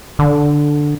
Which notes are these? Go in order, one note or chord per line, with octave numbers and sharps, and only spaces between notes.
D3